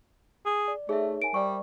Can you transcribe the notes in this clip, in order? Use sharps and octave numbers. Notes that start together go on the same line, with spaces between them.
G#4
D5
A3 D#4 G#4 C#5 E5
A#4 E5 G#5 A5 D7
G3 C5 D5 C#6